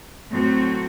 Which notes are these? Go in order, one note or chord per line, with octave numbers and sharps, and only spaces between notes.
A2 F#3 C4 F#4